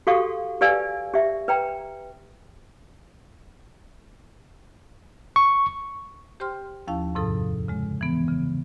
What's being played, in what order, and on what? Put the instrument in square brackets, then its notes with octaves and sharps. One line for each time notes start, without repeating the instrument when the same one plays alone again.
[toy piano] F#4 G4 A4 F5 C#6 D#6
G4 B4 D5 F5 G#5 E6
G4 E5
B4 G5 A#5
[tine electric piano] C#6
[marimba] G4 C5 G5 C6 F6
D#2 F3 C#4 E4 F5 A5
F2 G#2 C3 F3 A4 D#6
C#3 G#3
E3 B3
C#3